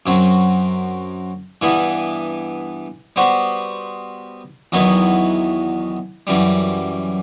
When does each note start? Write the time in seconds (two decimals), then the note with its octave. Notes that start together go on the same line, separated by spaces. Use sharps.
0.06 F#2 F#3 C4
1.62 G2 E3 B3 E4
3.16 G3 B3 F#4 C5
4.72 E2 D#3 F#3 B3 E4
6.27 F#2 E3 G3